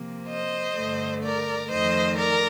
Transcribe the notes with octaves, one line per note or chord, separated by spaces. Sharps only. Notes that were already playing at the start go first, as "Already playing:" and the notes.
Already playing: C3 F3 A#3
C5 D#5
G2 D3 A3
A#4 D5
F2 D#3 A3 C5 D#5
A#4 D5